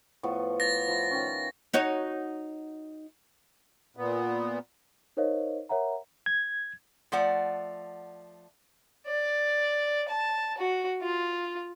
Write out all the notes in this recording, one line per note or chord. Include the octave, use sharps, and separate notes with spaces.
A2 F3 B3
A6 A#6
F3 E4
D#3 C#4
D#4 F#4 C#5
A#2 B3
D#4 A#4 C5 C#5 D#5 F5
A#4 C#5 E5 F#5 A#5
G#6
F3 A3 D5 F#5
D5
A5
F#4
F4